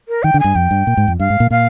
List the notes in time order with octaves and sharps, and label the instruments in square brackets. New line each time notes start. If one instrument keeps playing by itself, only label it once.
[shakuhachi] A#4
[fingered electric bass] D#3 [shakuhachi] G5
[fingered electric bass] D3
[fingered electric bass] G2 [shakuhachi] G#5
[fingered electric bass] F2 [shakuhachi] G5
[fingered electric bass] G2
A#2
G#2
F2
[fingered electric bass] G2 [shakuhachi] F5
[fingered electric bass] G#2
A#2
[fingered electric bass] A#2 [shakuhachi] F5